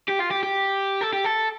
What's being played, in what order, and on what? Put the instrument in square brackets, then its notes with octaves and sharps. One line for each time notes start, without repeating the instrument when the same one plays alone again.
[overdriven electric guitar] G4
F4
G4
G4
A4
G4
A4